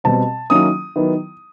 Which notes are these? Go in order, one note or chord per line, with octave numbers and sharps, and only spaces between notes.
B2 G3 C4 A5
D#3 F#3 A#3 C#4 E4 D#6
D#3 F#3 B3 E4